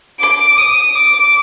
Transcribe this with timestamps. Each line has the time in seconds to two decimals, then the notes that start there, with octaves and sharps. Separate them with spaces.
0.20 D6
0.57 D#6
0.95 D6